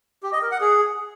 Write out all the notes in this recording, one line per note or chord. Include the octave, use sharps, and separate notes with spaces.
G4
D#5
A#4
F#5
G#4